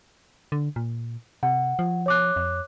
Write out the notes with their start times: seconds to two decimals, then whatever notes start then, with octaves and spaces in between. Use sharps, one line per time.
0.52 D3
0.76 A#2
1.43 C3 F#5
1.79 F3
2.06 C#5 D6 F#6
2.36 F2